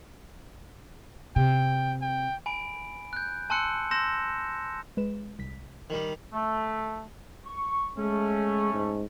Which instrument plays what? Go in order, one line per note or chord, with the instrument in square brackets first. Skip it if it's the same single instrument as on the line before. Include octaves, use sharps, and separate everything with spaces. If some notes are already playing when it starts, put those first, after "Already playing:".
[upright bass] C3 [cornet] G5
[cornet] G5
[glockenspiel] G#5 B5 D7
F#6 G6
G#5 A5 C6 E6 F#6 C#7
C6 E6 G6 A#6 E7
[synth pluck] G#3 B4 E7
C2 B6
[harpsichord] D#3 G3
[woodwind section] A3
C#6
[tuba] G#3 [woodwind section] A3 C#4
[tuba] G#2